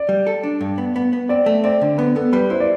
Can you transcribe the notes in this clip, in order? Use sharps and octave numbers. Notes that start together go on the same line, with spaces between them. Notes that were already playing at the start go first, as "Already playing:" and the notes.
Already playing: D5
G3
A4
D4
G2
B3
B3
B3
C4 D5
A3
C4 D5
D3
B3 B4
B3 A4
G3 B4
E4 C5
D5